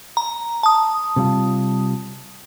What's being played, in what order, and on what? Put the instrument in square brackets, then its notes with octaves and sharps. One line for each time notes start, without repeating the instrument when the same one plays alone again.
[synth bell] A#5
A5 D#6
[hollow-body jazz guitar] C3 G3 F4